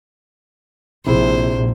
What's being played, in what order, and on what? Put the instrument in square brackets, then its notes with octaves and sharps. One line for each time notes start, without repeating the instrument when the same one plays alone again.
[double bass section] A#1 [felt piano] C3 E4 G#4 [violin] C5